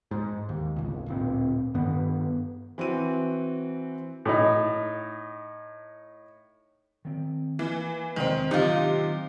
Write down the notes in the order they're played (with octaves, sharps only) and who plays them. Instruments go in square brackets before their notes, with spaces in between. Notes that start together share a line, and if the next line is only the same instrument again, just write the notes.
[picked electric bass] G#2
D#2
G#1 C#2
D1 A#2 C4
G2 D#3 B3
[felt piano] E3 C4 F#4 D#7
[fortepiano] A2 D#4
[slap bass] D#3 C4
[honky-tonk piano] E3 [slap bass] A#3
[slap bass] E1 C3 G#3 [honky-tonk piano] D#3 C4
[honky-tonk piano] C3 [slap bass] D#3 F#3 A#3 [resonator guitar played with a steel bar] D#4 F4